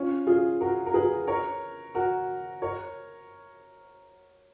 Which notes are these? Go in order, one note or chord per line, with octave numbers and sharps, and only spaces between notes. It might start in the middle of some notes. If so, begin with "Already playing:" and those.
Already playing: C#4 F4
F4 G#4
F#4 A#4
A#4
G#4 B4
A#4 C#5
F#4 A#4
A#4 C#5